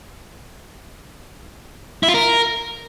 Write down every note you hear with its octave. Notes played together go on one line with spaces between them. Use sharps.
E4
F4
A#4